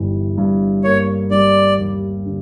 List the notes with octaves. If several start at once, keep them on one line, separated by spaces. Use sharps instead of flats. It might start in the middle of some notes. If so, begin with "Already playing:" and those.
Already playing: G1 E3 G3
G2
A#3 C#5
G3 D5
D#2
D3